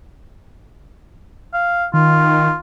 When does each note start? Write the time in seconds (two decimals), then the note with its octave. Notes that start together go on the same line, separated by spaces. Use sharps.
1.53 F5
1.94 D#3 F4